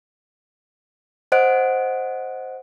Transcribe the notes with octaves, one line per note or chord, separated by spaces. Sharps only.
C5 D#5 F#5 F#6 D7